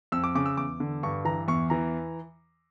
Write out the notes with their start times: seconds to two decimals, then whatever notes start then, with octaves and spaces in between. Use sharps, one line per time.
0.12 F2 E6
0.24 D6
0.35 C#3 D6
0.46 E6
0.57 E2 D6
0.80 D3
1.03 G2 C#6
1.25 E3 A#5
1.48 E2 C#6
1.70 E3 A#5